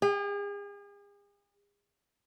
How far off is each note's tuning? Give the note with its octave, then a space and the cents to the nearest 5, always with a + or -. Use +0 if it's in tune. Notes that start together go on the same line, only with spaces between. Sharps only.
G#4 -40 G5 +0